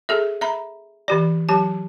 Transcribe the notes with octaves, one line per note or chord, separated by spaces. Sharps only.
G#4 A4 E5
E5 A#5 B5
E3 G4 D5
F#3 G4 A5